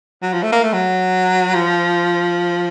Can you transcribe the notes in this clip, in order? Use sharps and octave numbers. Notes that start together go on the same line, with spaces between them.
F#3
F3
A3
A#3
A3
F#3
F3